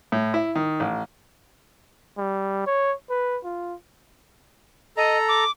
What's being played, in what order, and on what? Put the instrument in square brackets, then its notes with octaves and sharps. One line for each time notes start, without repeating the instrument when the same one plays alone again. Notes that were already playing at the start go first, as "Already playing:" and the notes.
[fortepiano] A2
E4
D#3
A1
[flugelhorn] G3
C#5
B4
F4
[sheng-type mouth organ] A4 A#5 [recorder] D#5
[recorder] D6